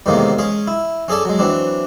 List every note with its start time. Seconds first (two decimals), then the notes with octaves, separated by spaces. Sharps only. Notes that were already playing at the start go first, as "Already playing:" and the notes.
0.06 E2 A2 C3 D#3 G#3 A#3
0.38 G#3 C#4 G#4
0.67 E4
1.08 C#4 G#4 A4 D5 A5
1.25 F#3 G#3
1.39 E3 F#3 C4 D4